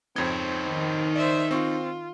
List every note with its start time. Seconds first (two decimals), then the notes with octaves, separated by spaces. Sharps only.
0.16 F2 C4 D#4 C#5 G#6
0.68 D#3
1.16 C5 D5 E5
1.51 C4 F4 C#6